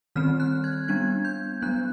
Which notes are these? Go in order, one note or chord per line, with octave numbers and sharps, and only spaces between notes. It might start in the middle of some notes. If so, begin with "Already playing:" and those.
D#3 G3 C4 F6
F#6
G#6
G3 B3 D4 G#6
G6
F#3 B3 D4 F#6